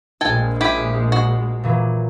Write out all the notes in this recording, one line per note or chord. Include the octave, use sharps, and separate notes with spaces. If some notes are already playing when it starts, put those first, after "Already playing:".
A#1 G#3 A4 G5 G#5
E4 G4 D#6 G6 D7
F#4
A#2 E3 F#3